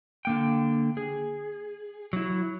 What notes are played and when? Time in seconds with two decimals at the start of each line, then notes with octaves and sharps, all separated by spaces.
0.25 D3 A#3 G5
0.97 G#4
2.13 F#3 E4